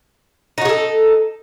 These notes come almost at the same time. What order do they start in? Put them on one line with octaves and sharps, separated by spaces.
D#4 F#4 G#4 A4